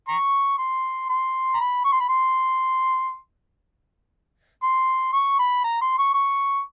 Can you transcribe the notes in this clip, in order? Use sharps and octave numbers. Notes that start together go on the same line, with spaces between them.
A#5 C#6
C6
C6
A#5
B5
C#6
C6
B5
C6
C6
C#6
B5
A#5
C6
C#6
C#6